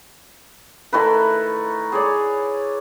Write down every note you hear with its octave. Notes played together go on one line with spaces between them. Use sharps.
D#3 A3 E4 B4
G#4 C#5 D5